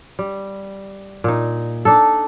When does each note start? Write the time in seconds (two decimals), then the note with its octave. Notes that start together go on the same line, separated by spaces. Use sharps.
0.19 G3
1.24 A#2 D#4
1.85 D4 D#4 A4